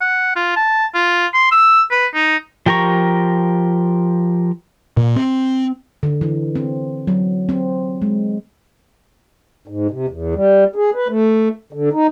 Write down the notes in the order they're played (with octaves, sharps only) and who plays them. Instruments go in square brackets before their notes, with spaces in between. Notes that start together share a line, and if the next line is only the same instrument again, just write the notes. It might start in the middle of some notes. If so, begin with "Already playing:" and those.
[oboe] F#5
F4
A5
F4
C6
E6
B4
D#4
[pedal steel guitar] F3 G4 A#4 A#5 C#6
[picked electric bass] A#2
C4
[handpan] D3
E3
C4
F#3
C4
G#3
[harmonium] G#2
C3
E2
G3
G#4
B4
A3
D3
D#4